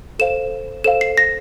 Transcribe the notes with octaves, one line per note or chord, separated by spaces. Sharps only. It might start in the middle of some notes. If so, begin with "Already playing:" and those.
A4 C5 F5 E7
A4 C5 F5 E7
C7
A#6